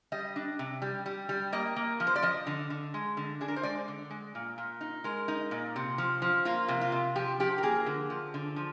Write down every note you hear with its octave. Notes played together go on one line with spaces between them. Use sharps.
G3 D#5
D4
C3
G3
G3
G3
A#3 D#5
A#3
F3
C5
D5
F3 D#5
D3
D3
G#3
D3
D4 G#4
A#4
C5
G#3 D5
D3
G#3
A#2
A#2
D#4
G#3 A#4
D#4
A#2
C3
F3
F3
A#3 F4
C3
F4
C3
F3 G4
F3 G4
A#4
A#3 G#4
D3
F3
D3
F3